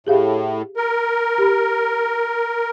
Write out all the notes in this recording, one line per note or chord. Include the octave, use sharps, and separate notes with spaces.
A2 G4 G#4 F5
A#4
G4 B5